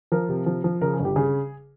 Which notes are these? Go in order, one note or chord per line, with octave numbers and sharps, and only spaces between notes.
F3 A#4
C3
F3
F3
C#3 A#4
G#4
G1
G4
C#3 G#4